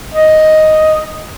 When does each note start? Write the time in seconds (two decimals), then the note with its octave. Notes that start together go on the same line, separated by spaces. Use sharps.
0.15 D#5